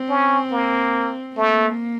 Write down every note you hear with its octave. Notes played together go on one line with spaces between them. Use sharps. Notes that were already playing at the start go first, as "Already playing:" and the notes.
Already playing: C4
C#4
A#3
A3 A#3